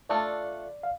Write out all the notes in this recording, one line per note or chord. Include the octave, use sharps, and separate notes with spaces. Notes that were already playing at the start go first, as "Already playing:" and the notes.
A3 D4 F4 A4 D5
F5